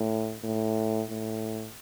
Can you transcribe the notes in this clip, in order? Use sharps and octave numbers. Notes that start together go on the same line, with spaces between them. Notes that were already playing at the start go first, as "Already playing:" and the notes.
Already playing: A2
A2
A2